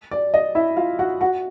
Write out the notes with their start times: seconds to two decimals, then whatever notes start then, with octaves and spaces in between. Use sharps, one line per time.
0.11 D5
0.34 D#5
0.55 E4 E5
0.77 F4 F5
0.99 F#4 F#5
1.21 F#4 F#5